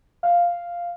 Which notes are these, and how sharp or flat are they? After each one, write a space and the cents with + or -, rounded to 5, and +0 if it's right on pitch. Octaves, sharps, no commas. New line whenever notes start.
F5 -5